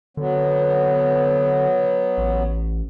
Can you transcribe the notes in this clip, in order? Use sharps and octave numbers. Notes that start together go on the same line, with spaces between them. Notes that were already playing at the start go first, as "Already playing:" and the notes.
D3 F#3 B3
A1